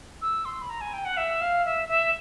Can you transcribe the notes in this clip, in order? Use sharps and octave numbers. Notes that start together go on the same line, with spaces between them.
E6
C6
B5
A#5
G#5
G5
F#5
E5
F5
E5
E5